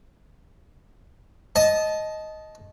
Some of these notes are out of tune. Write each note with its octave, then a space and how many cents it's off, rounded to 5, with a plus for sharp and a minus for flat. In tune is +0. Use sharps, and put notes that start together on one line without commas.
D#5 +5 A5 -20